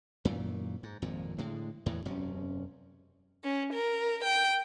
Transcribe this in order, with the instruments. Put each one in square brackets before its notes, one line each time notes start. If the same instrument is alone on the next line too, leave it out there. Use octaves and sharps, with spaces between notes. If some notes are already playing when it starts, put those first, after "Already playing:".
[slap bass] F#2 A#2 D#3 E3
G#2
G#1 F2 A#2
A2 D3 G#3
E2 A2 E3
E1 F#2 C3 C#4
[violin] C#4
A#4
G5